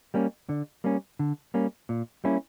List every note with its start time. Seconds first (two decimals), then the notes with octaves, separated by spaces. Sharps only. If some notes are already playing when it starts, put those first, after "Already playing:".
0.14 G3 A#3 C#4
0.49 D3
0.84 G3 A#3 C#4
1.19 D3
1.54 G3 A#3 C#4
1.89 A#2
2.24 G3 A#3 C#4 E4